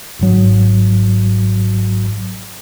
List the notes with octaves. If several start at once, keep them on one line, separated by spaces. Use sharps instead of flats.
G#1 G#2 F#3